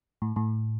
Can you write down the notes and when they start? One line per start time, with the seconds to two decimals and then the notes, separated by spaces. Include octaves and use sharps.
0.22 A2
0.36 A2